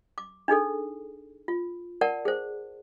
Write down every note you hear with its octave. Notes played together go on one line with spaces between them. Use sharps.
D6
D4 D#4 G#4 A4
F4
A#4 D5 F#5 A5
G#4 C5